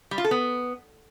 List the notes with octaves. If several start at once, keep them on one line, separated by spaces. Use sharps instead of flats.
G3
F4
A4
B3